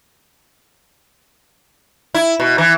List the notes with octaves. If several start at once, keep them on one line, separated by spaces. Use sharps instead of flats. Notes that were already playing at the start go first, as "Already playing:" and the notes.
E4
B2
E3